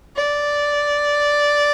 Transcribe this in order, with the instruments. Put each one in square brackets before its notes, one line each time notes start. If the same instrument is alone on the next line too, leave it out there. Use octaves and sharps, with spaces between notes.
[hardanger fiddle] D5